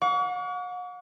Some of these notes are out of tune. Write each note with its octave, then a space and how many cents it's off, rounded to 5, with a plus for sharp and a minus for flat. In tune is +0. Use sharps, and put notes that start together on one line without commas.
F#5 -40 C#6 +45